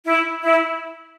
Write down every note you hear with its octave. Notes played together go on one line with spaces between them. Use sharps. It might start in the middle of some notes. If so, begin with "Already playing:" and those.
E4
E4